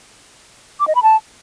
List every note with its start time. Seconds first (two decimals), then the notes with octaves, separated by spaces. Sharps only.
0.80 D6
0.88 D#5
0.95 B5
1.03 A5